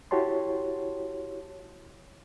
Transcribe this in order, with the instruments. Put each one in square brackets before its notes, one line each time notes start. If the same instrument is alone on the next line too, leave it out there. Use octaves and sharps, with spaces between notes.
[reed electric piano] E4 F#4 G4 C#5 A5 C6